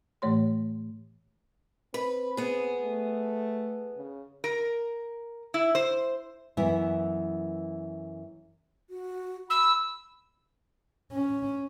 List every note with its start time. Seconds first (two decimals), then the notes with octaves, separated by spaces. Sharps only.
0.22 A2 E3 A3 C#5 C6
1.94 C4 B4
2.37 B3 G#4
2.81 A3
3.96 C#3
4.44 A#4
5.54 E4
5.75 C5
6.57 F#2 E3 B3 E4 E5
8.90 F#4
9.50 B5 E6
11.13 C#4